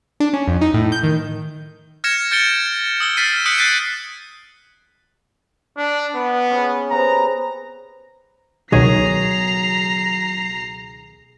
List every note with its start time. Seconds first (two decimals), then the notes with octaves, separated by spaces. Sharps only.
0.20 D4
0.33 C#4
0.47 F2
0.61 D#4
0.74 A2
0.92 G6
1.03 D#3
2.04 F6 G#6 A#6 C#7 E7
2.31 F6 G6 A6 C#7 D7 G7
3.00 D#6 E6 G7
3.17 F6 A6 B6 C7 D#7
3.46 D#6 F#6 G6 B6 C#7 D7
3.58 F#6 A6 B6 C7 D#7
5.77 D4
6.15 B3
6.50 C#4 G#4
6.91 C3 B3 A#5
8.72 C#2 B2 D#3 F#3 G#4 A#5 C7